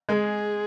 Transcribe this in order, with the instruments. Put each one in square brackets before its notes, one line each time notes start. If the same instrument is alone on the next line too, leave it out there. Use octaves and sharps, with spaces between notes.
[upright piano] G#3 [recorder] A#4
[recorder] G#4